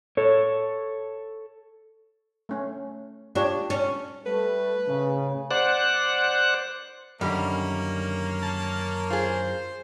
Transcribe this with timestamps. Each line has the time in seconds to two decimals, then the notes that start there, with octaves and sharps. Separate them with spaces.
0.17 A4 C#5
2.49 A3 C#4
3.35 D4 F4 G4 C#5
3.70 C#4
4.26 G3 A3 A4 B4
4.87 A2 C#3
5.51 C5 D5 F#5 F#6
7.21 F#2 D3 D#3 G3 A#3 C#4 A#4
8.43 A5
9.10 F4 G#4 C5